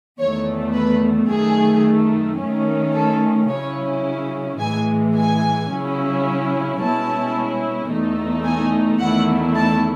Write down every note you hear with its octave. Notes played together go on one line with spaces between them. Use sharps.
E2 D#3 A3 C#5
B4
F#2 D#3 A3 G#4
D#3 A3 C#4
A4
C#3 F#3 C#4 E4 C#5
A2 E3 G#3 G#5
G#5
C#3 F#3 C#4 E4
B2 G#3 C#4 E4 A5
E2 B2 A3 D#4
G#5
E2 D#3 A3 E4 F#5
A5